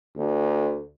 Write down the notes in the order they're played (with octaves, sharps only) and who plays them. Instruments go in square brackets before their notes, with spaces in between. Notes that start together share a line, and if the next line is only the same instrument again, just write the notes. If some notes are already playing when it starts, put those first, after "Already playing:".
[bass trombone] D2